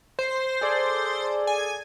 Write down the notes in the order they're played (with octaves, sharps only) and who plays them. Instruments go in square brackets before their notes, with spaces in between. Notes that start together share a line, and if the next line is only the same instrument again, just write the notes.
[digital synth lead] C5
[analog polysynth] G#4 A4 D5
[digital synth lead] G#5